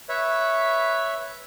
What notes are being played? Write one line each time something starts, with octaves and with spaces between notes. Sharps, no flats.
B4 C#5 E5